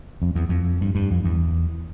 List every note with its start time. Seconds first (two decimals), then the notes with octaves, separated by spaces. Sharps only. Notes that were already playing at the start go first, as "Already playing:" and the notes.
0.22 F2
0.35 E2
0.49 F2
0.81 G2
0.95 G2
1.11 F2
1.25 E2